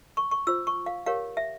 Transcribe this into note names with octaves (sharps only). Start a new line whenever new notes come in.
C#6
C#6
F4 C5 E6
C#6
F5
G4 A#4 C#5 F5
E5